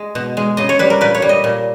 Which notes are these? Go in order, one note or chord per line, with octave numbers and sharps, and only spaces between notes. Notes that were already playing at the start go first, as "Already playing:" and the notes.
Already playing: G#3
B2
G#3
C#3 D#5
C#5
G3 B4
A#4
A#2 B4
C#5
G3
D#5
A#2